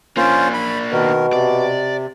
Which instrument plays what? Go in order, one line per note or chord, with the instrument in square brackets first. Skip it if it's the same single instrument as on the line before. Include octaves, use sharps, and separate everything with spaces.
[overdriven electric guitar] A#3 D4 [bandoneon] C#4 F4 C5
[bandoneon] B5
[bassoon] B2 [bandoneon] D#3 A#4
[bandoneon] C3 [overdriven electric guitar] D5